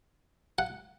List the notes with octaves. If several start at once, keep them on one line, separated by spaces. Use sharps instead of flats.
F#5